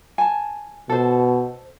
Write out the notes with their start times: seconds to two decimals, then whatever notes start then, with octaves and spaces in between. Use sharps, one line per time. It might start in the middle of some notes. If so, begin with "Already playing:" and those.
0.18 G#5 A5
0.89 B2 A4 C5